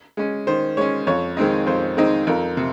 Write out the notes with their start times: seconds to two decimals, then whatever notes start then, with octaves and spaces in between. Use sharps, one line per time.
0.17 G#3 C#4
0.47 D#3 C5
0.77 G#3 C#4 C#5
1.07 F2 C#5
1.37 D#3 G#3 C4 D#4
1.66 F2 C5
1.97 D#3 G#3 C4 D#4
2.27 F2 A#4
2.57 C3